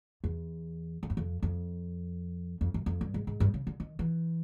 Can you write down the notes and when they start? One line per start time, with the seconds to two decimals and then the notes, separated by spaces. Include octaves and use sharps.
0.24 E2
1.03 F2
1.10 F#2
1.17 F2
1.43 F2
2.61 F2
2.74 F#2
2.86 F2
3.01 G2
3.14 G#2
3.27 G#2
3.40 G2
3.54 C#3
3.67 D3
3.80 D#3
3.99 E3